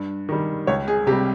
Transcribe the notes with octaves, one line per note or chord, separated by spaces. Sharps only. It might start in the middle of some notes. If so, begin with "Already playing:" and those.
Already playing: G2
D#3 G3
C#2 C#5
G#4
C3 G4
G3